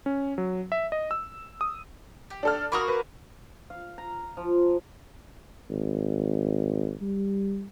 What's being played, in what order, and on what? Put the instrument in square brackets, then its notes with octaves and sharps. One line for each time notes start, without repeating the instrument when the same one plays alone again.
[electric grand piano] C#4
F#3
E5
D#5
E6
D#6
[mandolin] G4
[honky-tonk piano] D4 A4 F6
[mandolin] A#3 F#4 A#4 [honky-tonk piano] B5 D#6
[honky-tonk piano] B4
[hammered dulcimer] F5
A#5
F3
[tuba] G#1
G3